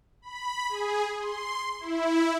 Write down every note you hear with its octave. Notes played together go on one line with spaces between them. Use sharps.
B5
G#4
C6
E4